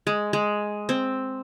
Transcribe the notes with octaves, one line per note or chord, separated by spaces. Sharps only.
G#3
G#3
C4